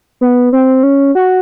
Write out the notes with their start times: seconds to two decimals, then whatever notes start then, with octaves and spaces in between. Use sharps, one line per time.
0.21 B3
0.53 C4
0.83 C#4
1.15 F#4